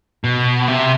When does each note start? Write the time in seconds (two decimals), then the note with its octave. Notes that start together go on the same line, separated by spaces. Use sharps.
0.24 B2
0.68 C3